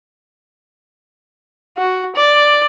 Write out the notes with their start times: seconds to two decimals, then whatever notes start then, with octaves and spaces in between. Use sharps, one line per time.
1.77 F#4
2.15 D5